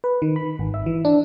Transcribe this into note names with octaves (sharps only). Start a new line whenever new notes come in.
B4
D#3
B5
G#1
E5
E3
D4